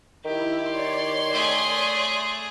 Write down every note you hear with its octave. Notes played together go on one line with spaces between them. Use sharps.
D#3 E4 G4
C#5 D5 C6
A3 G#4